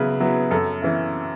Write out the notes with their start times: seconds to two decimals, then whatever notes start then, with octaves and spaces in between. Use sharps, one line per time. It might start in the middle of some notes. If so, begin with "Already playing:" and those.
Already playing: C#3 F#3 B3 E4 B4
0.20 F#3 B3 E4
0.51 F#2 A4
0.82 E3 C#4 E4